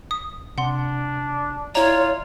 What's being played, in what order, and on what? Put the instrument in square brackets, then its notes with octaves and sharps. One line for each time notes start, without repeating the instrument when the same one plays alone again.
[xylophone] D#6
[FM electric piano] C3 [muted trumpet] D4 [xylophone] F#5 C6
[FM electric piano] E4 D5 [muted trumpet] F4 [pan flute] C#5 [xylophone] A#5